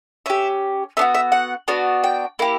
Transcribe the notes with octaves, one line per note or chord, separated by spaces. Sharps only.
C#4 G4 E5
B3 D4 F#4 E5
E5
F#5
B3 D4 F#4
G5
A#3 E4 G4